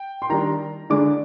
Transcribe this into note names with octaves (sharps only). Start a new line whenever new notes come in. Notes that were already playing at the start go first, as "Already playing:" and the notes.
Already playing: G5
C6
D#3 G3 D4 A#5
D3 G#3 D4 D6